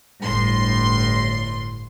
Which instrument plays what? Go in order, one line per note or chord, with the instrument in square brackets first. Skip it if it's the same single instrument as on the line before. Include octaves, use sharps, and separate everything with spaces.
[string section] G1 A2 C6